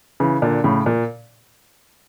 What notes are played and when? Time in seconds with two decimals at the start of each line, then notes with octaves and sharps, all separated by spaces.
0.20 C#3 E3
0.42 A#2 D3
0.64 A2 C#3
0.86 A#2